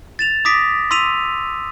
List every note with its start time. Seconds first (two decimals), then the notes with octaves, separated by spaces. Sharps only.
0.19 A6 E7 F7
0.45 D6 D#6 A#6 B6 D7
0.91 C6 E6 B6 D#7 F7